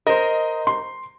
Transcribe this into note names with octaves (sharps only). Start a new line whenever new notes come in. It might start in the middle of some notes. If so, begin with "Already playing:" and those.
A#4 C5 D#5
C6